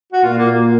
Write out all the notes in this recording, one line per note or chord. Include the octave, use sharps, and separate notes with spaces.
F#4
A#2 F4
A#3
A#3